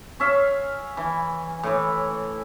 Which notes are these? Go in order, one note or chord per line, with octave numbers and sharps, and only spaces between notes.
C#4 E5 F5
E3
A2 E3